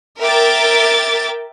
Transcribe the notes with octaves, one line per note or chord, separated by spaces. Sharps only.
A#4 E5 G5 D6 A6